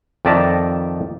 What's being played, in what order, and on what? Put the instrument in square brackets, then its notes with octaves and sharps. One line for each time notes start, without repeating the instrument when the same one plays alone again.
[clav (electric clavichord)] F2 D#3 D5 E5 A5 A#5